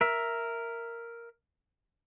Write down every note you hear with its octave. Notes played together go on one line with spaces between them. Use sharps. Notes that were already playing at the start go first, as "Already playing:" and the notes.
A#4 E5